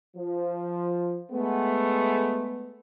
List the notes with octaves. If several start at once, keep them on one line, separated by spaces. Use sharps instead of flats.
F3
G#3 A3 B3